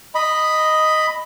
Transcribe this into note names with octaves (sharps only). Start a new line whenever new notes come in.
D#5 B5